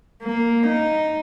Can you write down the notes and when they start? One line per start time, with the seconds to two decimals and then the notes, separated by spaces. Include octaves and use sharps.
0.24 A#3
0.67 D#4